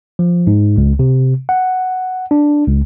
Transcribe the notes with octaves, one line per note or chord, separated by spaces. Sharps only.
F3
G#2
C#2
C3
F#5
D4
C#2